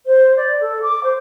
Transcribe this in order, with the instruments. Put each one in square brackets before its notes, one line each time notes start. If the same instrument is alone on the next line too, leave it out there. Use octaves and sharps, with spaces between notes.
[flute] C5
D5
A4
D6
C5